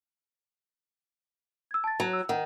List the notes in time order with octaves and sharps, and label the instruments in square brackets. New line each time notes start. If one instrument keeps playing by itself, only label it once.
[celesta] E6 G#6
A5 A6
[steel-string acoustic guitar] F#3
[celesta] E6
[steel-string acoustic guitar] D#3 [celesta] F#5